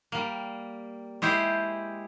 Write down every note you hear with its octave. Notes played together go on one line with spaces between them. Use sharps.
G3 A#3
G#3 E4 G4 C5